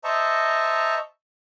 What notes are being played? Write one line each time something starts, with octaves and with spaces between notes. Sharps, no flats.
C5 D#5 E5 A5 A#5 C#6